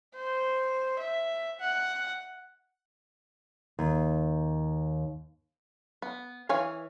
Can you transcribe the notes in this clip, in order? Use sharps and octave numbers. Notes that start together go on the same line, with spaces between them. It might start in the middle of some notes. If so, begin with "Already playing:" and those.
C5
E5
F#5
D#2
B3
E3 C#5 F5 G#5